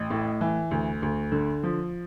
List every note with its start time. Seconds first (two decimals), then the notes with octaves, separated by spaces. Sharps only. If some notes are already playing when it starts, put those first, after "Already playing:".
Already playing: A1
0.10 A2
0.41 E3
0.71 D2
1.02 D2
1.32 D3
1.63 F3